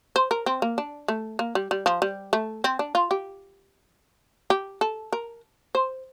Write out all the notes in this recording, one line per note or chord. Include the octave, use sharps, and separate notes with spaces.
C5
A#4
C4
A#3
D4
A3
A#3
G3
G3
F3
G3
A3
C4
D4
F4
G4
G4
A4
A#4
C5